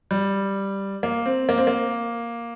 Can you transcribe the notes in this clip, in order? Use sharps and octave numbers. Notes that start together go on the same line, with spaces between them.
G3
A#3
C4
A#3
C4
A#3